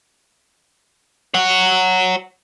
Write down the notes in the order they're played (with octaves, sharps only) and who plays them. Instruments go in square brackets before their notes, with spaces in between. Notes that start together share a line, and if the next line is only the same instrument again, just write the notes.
[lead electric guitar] C#5 F#5